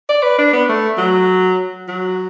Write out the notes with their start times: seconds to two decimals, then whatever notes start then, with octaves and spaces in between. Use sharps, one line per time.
0.09 D5
0.23 B4
0.39 D4
0.53 B3
0.69 A3
0.98 F#3
1.88 F#3